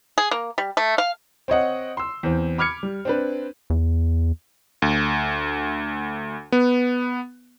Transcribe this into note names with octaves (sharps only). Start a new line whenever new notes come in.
G#4
A#3
G3
A3
F5
C4 C#5 D#5 F#5
C6 E6
E2 C4
B5 D6 F6 G#6 C#7
G3
C4 D4 B4
E2
D2
B3